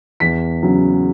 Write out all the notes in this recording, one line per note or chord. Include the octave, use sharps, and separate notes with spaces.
E2 B6
C#3 F#3